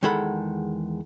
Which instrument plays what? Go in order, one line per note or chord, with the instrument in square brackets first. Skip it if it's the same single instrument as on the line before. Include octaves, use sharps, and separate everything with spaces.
[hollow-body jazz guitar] E2 D#3 G#3 A4 F#5 B5